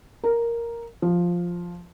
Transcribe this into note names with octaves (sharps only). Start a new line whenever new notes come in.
A#4
F3